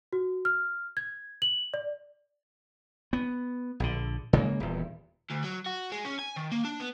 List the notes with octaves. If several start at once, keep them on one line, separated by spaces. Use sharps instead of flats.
F#4
F6
G#6
F#7
D5
B3
A#1 D3
C#3 G#3 A#3
D#1 E2
D2
F#3
F#4
G#3
C#4
G#5
D#3
A#3
D4
B3